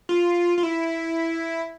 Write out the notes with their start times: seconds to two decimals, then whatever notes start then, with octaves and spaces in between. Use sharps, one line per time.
0.09 F4
0.58 F4
0.63 E4